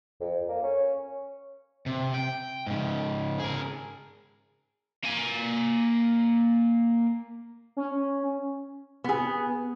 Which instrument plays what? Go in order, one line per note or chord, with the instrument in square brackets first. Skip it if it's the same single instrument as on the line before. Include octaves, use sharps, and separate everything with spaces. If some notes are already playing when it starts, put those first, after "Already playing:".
[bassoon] F2
A#3
C#4
[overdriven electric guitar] C3
G5
G#2 C#3
G#4 A#4
A#3 G#5
[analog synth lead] C#4
[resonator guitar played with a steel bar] B3 G#4